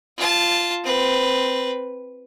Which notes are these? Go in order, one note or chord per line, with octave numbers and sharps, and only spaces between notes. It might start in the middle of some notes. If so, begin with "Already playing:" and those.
F4 A5
C4 B4